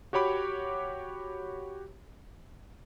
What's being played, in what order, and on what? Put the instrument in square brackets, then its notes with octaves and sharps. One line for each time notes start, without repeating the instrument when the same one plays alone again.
[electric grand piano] F#4 G4 C#5 B5 D6